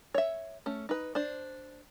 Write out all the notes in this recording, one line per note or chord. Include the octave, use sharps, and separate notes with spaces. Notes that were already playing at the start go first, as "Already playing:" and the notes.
C#5 E5
A3 C#4
D#4 B4
D4 C5